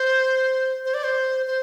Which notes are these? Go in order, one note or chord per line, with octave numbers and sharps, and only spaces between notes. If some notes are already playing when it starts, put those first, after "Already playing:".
Already playing: C5
C5
D5
C5
C5